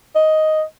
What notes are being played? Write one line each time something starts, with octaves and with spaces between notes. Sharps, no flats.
D#5